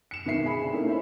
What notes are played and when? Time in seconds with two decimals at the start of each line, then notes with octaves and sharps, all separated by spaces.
0.11 C#7 E7
0.26 G#1 B2 D#3 E5 C7
0.45 G#4 G#5 B5
0.61 C3 C4 D4
0.73 A3 A#3 C#4 D#4 E4
0.87 C5 C#5 E5 B5